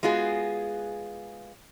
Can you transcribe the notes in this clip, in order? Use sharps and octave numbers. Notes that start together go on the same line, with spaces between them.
G#3 B3 F4 F#4 G#4